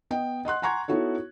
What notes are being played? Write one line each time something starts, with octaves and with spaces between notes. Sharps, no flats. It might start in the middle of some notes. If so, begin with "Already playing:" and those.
B3 D#5 G5
D#5 F#5 C6 F#6
F#5 G#5 A#5 C6 C#6 G#6
B3 D#4 E4 F#4 A4 C#5